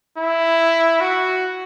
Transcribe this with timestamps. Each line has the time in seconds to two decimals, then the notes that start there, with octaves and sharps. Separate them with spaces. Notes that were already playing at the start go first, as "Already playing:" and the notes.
0.18 E4
1.00 F#4